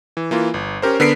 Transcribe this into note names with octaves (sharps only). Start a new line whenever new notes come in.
E3
E3 A#3 F4
G1
C#4 G4 A#4 C5
D3 B3 A#4 B6 C7 D7